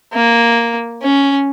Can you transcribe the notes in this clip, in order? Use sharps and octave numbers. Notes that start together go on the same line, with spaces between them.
A#3
C#4